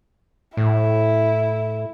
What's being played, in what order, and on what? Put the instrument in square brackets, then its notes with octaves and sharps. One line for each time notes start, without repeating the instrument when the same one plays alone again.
[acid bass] A2 [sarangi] E4